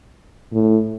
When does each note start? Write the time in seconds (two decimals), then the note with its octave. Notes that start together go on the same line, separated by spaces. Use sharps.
0.53 A2